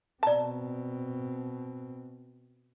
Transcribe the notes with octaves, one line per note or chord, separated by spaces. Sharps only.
B2 C4 D5 A5 A#5